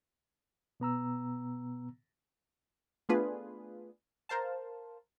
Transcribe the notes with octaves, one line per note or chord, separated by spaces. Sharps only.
B2 B3 A#5 E6
A3 B3 D4 F4 G#4 B4
A#4 C5 F5 A5